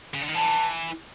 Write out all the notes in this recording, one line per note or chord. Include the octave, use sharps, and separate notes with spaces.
C#3
D3
D#3
E3 A5